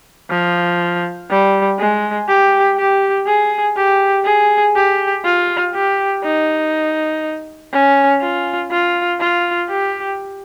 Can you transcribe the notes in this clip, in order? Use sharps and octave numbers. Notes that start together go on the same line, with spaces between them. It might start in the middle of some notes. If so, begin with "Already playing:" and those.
F3
G3
G#3
G4
G4
G#4
G4
G#4
G4
F4
G4
D#4
C#4
F4
F4
F4
G4